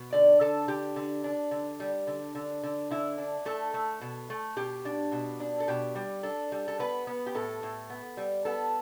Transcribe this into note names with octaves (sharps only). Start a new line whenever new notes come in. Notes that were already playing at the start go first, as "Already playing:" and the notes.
Already playing: B2
D3 D5
D3 A4
D3 G4
D3
D4
D3
G3
D3
D3
D3
D3 E4
D4
A3 A4
A3
B2
A3
B2 G4
D4
B2
D4
A4
B2 G4
G3
D4 A4
G3
A4
B3 B4
B3
G4
A2 A4
A2
B3
G3
B3 A4